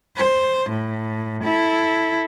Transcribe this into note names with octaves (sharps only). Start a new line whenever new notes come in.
C5
A2
E4 A4